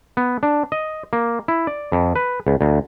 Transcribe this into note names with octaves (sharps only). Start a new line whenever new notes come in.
B3
D4
D#5
A#3
E4
D5
F2
B4
C#2
D2